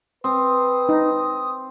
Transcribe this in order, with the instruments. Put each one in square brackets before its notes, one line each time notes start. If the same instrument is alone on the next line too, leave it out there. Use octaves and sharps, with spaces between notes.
[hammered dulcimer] C4 [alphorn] B4 [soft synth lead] D#6
[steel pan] D#4